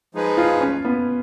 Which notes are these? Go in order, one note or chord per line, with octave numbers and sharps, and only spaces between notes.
F3 G#3 D#4 G#4 B4
F4
C#4
B3